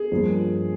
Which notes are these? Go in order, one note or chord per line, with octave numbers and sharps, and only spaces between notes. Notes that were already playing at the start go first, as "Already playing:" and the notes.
Already playing: G#4
G2 F3 A#3